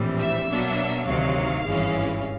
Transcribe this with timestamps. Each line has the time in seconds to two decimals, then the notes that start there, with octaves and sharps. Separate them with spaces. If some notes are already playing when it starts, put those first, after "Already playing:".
Already playing: A#1 A2 E3 G3 C4
0.20 E5
0.48 B2 F#3 A#3 D4
1.07 D2 C3 D#3 F#3 F5
1.64 G#1 G2 E3 G#3 C#4